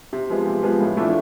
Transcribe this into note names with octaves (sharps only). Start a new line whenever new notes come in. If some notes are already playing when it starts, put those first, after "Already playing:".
C3
F3 G#3 B3
C3
F3 G#3 B3
A2
E3 A3 D4 F4